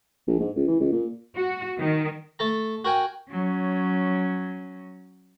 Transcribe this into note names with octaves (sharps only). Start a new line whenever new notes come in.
A#1
G#2
C#2
E3
C#2
A#2
F#4
D#3
A3 A4 A#5
F#4 A#4 G5 G#5
F#3 C#4